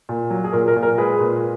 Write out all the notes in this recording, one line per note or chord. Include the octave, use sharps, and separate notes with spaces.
A#2
F#3
G#4
A#2 A#4
A#4
A#2
A#4
G#3 G#4 B4
A#2